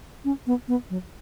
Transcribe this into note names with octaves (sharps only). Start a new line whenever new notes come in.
C#4
B3
B3
F#3